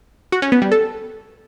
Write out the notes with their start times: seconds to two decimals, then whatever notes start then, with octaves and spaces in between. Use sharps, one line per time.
0.32 F#4
0.42 C#4
0.52 B3
0.62 G3
0.72 A4